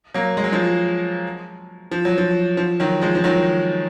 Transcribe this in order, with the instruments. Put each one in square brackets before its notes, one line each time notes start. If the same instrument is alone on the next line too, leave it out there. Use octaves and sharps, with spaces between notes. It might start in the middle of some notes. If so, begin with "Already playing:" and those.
[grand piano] F#3 A#3
G#3
F#3
F3 G#3
F3
F#3
F3
F3
D#3 F#3
F3 G#3
F3
D#3 F#3